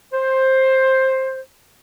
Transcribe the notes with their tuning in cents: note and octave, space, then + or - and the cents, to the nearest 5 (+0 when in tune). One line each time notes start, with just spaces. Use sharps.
C5 +10